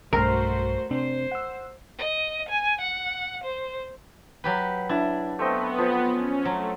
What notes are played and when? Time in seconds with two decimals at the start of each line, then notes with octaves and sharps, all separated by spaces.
0.13 B1 G2 A3 F#4 A#4 C5
0.91 C3 C4 D4 C5
1.32 F#5 E6
1.98 D#5
2.49 G#5
2.80 F#5
3.43 C5
4.44 F#3 G4 B4
4.89 D4 E4
5.39 A3 B3 C4 D#5
5.78 F3 D#6
6.13 C#4
6.45 F#3 A3